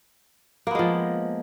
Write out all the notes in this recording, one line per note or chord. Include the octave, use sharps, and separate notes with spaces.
F3 G#3 A#3 B3